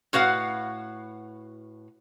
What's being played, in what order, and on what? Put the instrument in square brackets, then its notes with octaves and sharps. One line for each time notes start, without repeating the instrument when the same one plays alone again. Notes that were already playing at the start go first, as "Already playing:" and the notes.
[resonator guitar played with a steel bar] A2 F#4 B4 F5 F#5